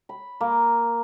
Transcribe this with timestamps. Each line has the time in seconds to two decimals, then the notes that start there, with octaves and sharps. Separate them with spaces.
0.09 B5
0.41 A#3